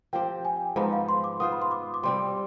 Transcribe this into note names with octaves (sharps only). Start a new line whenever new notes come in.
F3 C4 G4 C5 G5
G#5
G#2 F3 B3 D#4 B5
F5
C6
D6
B3 F4 C5 D#6
B5
C6
D6
D6
C3 G3 C4 C6